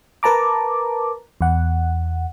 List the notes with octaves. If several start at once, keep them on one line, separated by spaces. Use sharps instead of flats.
A#4 B4 A5 A#5 D6
E2 F#5